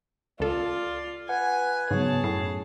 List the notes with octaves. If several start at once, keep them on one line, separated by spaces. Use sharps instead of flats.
C#2 F4 A4 D5
B4 F#5 G#5
G#2 C#3 F#3 B3 G#4 C#5 A5
F#2 A2 C7